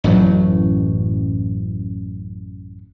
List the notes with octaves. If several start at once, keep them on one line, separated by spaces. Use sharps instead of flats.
A1 F#2 A2 F#3